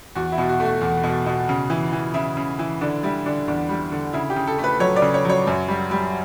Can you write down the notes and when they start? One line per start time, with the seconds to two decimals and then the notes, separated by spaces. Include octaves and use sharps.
0.15 E2 F#4
0.32 E4
0.38 B2
0.49 F#4
0.60 A3
0.65 F#4
0.81 E2
1.03 B2
1.26 B2
1.49 C#3
1.70 E3
1.92 E3
2.14 C#3 E4
2.37 C#3
2.59 E3
2.81 D3 D4
3.03 G3 E4
3.26 D3 D4
3.48 E2 D4
3.69 G3
3.92 D3
4.13 C#3 E4
4.30 G4
4.36 C#3
4.47 A4
4.58 A3
4.64 B4
4.80 F#3 C#5
4.96 D5
5.02 C#3
5.14 C#5
5.25 F#3 C#5
5.47 F#2
5.68 G3
5.91 G3